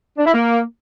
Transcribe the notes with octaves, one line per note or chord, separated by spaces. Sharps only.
D4
E4
A#3